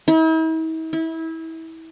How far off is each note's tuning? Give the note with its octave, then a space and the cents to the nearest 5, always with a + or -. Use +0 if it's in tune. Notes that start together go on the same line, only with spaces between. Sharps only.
E4 -45
E4 -25